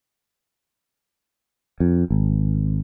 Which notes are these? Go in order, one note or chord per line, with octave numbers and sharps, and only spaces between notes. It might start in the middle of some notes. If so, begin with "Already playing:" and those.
F2
G#1